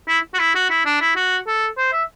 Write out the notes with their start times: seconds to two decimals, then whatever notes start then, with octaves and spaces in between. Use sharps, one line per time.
0.08 E4
0.34 F#4
0.39 E4
0.55 F#4
0.70 E4
0.86 D4
1.01 E4
1.16 F#4
1.47 A4
1.77 C5
1.92 E5